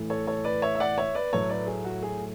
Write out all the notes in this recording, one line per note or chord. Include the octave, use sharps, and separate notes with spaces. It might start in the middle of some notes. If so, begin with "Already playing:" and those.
Already playing: A2 E3 A3
A4 C#5
A4 C#5
B4 D5
C#5 E5
E5
D5 F#5
C#5 E5
B4 D5
A2 F#3 A3 A4 C#5
B4 D5
G#4
F#4
G#4